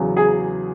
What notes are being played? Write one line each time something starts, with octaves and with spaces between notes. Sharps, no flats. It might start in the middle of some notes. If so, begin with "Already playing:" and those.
Already playing: E2 C#3 F#3
G#4